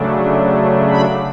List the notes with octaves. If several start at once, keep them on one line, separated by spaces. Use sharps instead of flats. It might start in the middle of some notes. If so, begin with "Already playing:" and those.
Already playing: C#3 F#3 A3 D4
B5